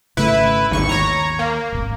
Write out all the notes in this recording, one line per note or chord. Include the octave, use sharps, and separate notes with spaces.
G#1 C#3 A3 E4 B4
G#1 D#2 C#6
C#5 A#5
A#3
D#1 G#1